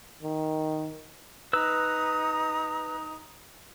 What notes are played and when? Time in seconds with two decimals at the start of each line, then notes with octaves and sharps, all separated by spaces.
0.23 D#3
1.53 D#4 B4 A#5 D#6 E6